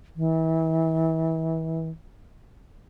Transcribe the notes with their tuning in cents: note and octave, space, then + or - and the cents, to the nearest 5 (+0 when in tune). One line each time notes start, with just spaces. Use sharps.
E3 -30